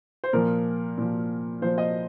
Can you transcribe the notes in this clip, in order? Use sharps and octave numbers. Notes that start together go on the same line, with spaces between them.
C5
A#2 F3 A#4
A#2 F3
A#2 F3 C5
D#5